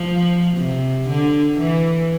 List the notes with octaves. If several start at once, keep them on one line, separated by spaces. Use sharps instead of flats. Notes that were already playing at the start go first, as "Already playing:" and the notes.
Already playing: F3
C3
D3
E3